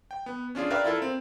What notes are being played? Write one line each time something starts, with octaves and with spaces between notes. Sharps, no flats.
G5
B3
C#4 D4 F4 G#4
A#4 B4 D5 E5 F5 G5
E4 F4 A4 A#4
C4